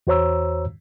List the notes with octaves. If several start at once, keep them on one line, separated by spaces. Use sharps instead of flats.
E2 F#4 C5 C#5 A#5 E6